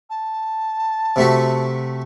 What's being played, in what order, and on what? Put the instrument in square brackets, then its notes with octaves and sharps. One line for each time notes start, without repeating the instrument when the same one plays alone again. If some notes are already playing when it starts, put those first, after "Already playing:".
[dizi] A5
[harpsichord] C3 A3 F#4